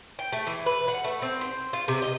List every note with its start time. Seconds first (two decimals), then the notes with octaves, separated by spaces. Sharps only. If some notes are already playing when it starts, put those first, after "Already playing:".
0.19 G5
0.32 A3
0.47 E3
0.66 B4
0.88 F#5
1.04 A3
1.22 C4
1.41 C5
1.73 F4
1.88 C3
2.02 D#5